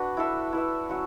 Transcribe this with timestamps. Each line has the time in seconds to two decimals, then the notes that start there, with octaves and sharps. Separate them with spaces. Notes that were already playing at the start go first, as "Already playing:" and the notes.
Already playing: D4 F#4 B4
0.17 E4 A4 E5
0.53 E4 B4 E5
0.89 F#3 C#4 F#4